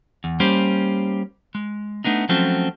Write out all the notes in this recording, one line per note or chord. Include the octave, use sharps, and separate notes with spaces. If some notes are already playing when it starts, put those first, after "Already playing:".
E2
G3 A#3 C#4 G4 C5
G#3
A3 B3 D4 D#4
F3 F#3 A3 C4 C#4 F#4